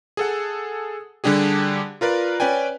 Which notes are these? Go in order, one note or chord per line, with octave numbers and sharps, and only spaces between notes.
G#4 A4 F#5
D3 G3 D4 G4 G#4
F4 A#4 B4 D5
C#4 B4 D5 G5 G#5